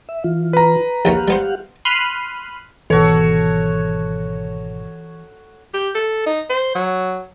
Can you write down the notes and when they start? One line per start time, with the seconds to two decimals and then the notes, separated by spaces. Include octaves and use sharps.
0.09 E5
0.24 E3 F4
0.53 B4 A#5
1.05 A#1 D#2 C#4 G4 F5 F#5
1.28 G3 B3 C5
1.85 B5 C6 F6 F#6 C7 D#7
2.90 G#1 B2 E3 F#4 A4 C#5
5.74 G4
5.95 A4
6.26 D#4
6.50 C5
6.75 F#3